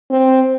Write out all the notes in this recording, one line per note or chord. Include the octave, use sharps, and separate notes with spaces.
C4